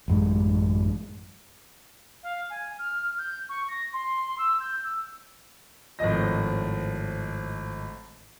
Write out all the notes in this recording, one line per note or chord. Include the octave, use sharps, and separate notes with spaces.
A1 F#2 G#3
F5
G#5
F6
G6
C#6
A#6
C6
E6
G6
E6
G#1 A2 F3 D#5 A#6